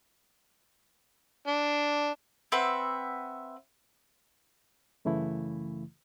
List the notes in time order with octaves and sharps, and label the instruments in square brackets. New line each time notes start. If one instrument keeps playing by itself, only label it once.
[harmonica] D4
[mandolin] C4 B4 E5 F#5
[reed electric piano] F#2 C#3 E3 A3 E4